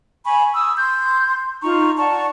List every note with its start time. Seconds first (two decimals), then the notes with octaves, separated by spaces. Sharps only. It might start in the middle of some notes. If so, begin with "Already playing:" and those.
0.25 G#5 B5 C#6
0.55 C#6 D#6 E6
0.77 C6 G6
1.62 D#4 F4 A#5 C#6
1.98 D5 F#5 A5 C#6